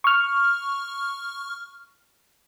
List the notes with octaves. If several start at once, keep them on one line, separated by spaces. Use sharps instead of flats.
C#6 F6